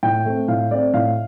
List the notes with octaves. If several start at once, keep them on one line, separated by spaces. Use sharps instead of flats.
A2 G5
A3 C4
A2 F5
A3 C4 D5
A2 F5